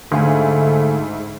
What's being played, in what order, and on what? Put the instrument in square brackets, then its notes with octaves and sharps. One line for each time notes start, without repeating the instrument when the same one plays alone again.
[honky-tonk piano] D2 [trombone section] G#2 [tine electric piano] D3 F5 G#5 [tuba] A3